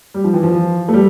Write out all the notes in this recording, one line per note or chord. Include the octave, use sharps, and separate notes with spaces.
G3
F3
E3
F3
A3
G3